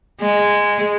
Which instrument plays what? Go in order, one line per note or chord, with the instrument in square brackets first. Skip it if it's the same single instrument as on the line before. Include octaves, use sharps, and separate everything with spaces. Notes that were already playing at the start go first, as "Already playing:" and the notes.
[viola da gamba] G#3